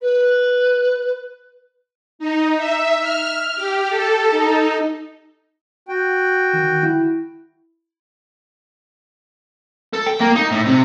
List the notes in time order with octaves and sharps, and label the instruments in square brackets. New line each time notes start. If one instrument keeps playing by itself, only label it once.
[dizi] B4
[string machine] D#4
E5
F6
G4
A4
D#4
[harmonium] F#4 G5
[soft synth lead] D#3
E4
[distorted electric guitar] A4
G5
A#3
D#4
A2
C3